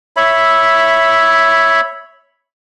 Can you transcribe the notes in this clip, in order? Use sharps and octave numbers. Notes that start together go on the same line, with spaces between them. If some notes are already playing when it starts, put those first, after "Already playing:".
C#5 E5 B5